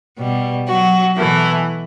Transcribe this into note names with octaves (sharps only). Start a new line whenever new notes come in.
B2 G3
F#3 F#4
B2 E3 A3 E4